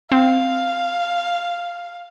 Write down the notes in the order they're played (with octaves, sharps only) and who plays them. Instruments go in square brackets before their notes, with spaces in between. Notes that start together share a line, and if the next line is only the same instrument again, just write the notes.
[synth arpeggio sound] C4 [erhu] F5